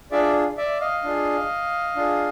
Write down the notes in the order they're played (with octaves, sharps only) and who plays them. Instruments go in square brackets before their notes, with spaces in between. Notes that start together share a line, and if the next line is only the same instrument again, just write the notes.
[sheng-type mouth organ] D4 F4 G#4 D5 E5
D5 E5
D#5 F5
D4 F4 G#4
D4 F4 G#4